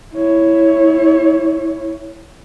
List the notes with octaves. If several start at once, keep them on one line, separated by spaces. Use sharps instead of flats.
E4 C#5